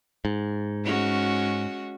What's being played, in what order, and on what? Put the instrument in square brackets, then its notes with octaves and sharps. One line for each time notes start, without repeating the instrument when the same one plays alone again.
[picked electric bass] G#2
[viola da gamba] G#3 C#4 F#4